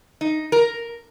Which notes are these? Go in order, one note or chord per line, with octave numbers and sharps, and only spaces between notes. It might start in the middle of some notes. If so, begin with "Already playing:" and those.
D#4
A#4